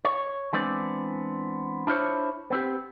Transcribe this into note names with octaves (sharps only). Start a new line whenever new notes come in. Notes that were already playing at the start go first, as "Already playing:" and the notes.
C#5
E3 G#3 B3 C4 D4 D5
D4 E4 F4 C5 C#5
B3 C4 G4